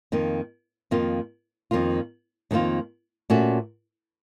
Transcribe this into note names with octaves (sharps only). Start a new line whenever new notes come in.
F2 D#3 A#3 F4
F2 D#3 A#3 F4
F2 D#3 A#3 F4
F2 D#3 A#3 F4
A#2 A3 C#4 F#4